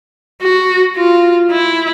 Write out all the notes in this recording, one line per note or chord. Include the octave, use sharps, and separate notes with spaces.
F#4
F4
E4